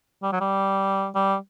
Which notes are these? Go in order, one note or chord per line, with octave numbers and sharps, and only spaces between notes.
G3
F#3
G3
G3